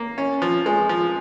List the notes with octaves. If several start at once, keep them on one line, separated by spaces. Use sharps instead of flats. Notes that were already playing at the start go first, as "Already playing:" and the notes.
Already playing: A#3
C#4
F3
G#3
F3